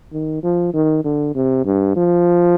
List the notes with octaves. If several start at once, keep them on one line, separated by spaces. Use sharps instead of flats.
D#3
F3
D#3
D3
C3
G2
F3